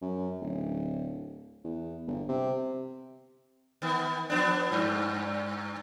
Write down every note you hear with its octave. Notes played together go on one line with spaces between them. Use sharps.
F#2
D1
E2
G1
C3
D#3 B3
F3 B3 D4
G2